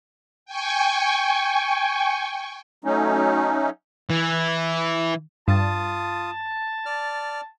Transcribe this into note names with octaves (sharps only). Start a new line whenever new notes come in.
G5 G#5 C#6
F#3 A3 C#4 D#4
E3
G2 F4 A5 D#6
D5 F6